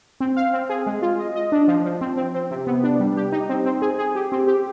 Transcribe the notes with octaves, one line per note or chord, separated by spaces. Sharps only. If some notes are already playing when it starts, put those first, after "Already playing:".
C4
F5
C4
G#4
G#3
F4
D#5
D#5
D4
F3
F3
C4
C4
C4
C3
B3
D4
G3
G4
D#4
C4
C4
G#4
G#4
G4
C4
G4